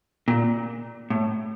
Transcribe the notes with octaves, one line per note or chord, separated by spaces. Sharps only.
A#2
A2